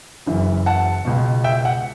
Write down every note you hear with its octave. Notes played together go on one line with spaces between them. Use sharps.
F#1 F#2 C#3 E3
F#5 A5
C#2 B2
E5 G5
F#5